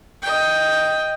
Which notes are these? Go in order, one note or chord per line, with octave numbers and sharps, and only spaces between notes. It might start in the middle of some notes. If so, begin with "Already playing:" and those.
D#5 G5